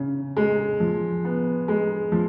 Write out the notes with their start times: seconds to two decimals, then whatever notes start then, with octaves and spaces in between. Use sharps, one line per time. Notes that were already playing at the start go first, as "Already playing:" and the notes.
Already playing: C#3
0.37 G#3
0.80 F3
1.25 B3
1.68 G#3
2.12 F3